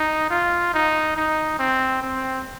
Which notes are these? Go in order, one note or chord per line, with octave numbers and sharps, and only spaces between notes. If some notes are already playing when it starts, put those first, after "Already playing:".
Already playing: D#4
F4
D#4
D#4
C4
C4